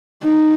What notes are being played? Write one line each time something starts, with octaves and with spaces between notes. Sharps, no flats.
D#4